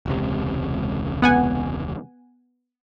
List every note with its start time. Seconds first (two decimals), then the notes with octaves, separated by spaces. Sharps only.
0.06 E1 C#2 C3
1.22 B3 F#5 G#5